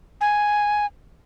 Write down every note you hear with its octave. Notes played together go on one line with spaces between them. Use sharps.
G#5